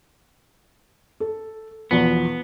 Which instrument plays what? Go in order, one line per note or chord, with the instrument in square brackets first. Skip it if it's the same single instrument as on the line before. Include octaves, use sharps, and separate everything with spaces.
[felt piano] A4
[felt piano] B1 E2 F3 [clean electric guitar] B3